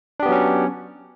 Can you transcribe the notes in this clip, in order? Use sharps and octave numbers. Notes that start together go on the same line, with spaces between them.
F#3 B3 C#4 D4 G4